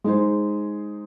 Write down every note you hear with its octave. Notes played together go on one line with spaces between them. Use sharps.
G#3 D#4 G#4 C5